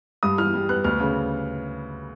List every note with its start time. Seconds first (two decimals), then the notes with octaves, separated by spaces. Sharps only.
0.23 G2 D#6
0.38 E3 F6
0.54 G3
0.69 B3 F#6
0.84 D2 F6
1.00 C#3